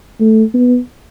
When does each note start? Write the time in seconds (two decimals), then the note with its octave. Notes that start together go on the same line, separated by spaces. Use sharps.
0.20 A3
0.54 B3